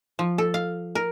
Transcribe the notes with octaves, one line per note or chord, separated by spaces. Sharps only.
F3
A4
F5
A#4